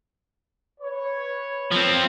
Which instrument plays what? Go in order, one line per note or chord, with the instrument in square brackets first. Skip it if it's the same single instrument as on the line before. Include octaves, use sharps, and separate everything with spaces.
[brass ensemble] B4 C#5
[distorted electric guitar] F3 C4